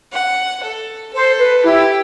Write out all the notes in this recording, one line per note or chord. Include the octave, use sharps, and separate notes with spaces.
F#5
A4
A4 C5
B4
E4 G4